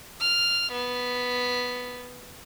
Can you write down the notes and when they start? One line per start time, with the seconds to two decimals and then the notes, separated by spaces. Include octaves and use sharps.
0.20 F6
0.72 B3